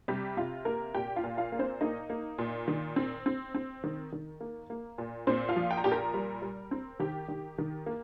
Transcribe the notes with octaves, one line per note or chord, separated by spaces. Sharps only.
C3 G3 G4
C3 F4
A#3 A#4
A#2 G4 G5
F4 F5
A#2
F4 F5
A#3
C4 C5
A#3 D#4 D#5
A#3
A#2
D#3
C4
C4
C4
D#3
D#3
A#3
A#3
A#2
A#2 C4 C5
F4 F5
F3
G5
A#5
A#2 G4 G5
A#4 A#5
G3
G3
C4
D#3 G4 G5
D#3
D#3
A#3